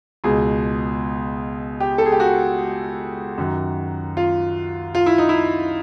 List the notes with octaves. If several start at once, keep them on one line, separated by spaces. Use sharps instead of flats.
C#2 B2 G#4
G4
A4
G#4
G4
F#4
F#2 D#3
F4
F4
E4
D#4
E4